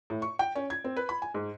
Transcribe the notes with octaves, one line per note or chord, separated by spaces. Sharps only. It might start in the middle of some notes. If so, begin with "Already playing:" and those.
A2
C#6
G5
C#4
G#6
C4
B4
B5
G#5
G#2